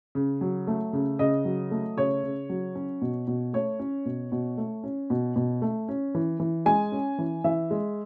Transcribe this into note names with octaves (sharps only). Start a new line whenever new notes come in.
C#3
F#3
A3
C#3
C#3 D#5
F#3
A3
C#3 C#5
C#3
F#3
C#4
B2
B2
A3 C#5
C#4
B2
B2
A3
C#4
B2
B2
A3
C#4
E3
E3
G#3 G#5
C#4
E3
E3 E5
G#3